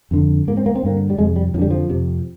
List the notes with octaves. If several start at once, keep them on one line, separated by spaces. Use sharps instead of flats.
F2 D3
G#2 A#3
C4
A#3
C4
G2 D3 A#3
G3
F2 C3 G#3
G3
F2 D3 F3 G3
F3
F2 C3